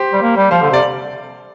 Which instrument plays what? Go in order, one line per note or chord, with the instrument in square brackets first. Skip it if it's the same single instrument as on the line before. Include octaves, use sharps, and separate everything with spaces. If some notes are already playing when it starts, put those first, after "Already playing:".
Already playing: [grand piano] G4 C5
[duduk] G3
A#3
G3
[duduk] F3 [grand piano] C5 F5
[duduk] D3
[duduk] C3 [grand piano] D5